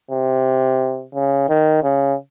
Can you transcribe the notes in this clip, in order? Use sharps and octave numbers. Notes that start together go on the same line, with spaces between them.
C3
C#3
D#3
C#3